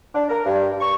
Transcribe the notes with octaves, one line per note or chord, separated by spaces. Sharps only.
D4
A#4
G2
C#6